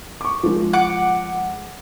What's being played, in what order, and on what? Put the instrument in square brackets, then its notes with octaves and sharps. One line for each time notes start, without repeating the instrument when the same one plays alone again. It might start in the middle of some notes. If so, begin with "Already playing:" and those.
[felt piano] C#6 D6
F3 G#3
[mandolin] F#5 D6